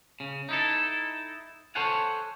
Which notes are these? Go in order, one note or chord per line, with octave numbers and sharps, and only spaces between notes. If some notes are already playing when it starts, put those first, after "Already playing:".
C#3
D#4 E4 A4
A4 C5 C#5 F5 F#5 G#5